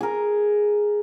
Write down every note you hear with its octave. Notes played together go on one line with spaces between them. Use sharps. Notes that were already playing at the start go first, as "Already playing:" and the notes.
G#4 A#4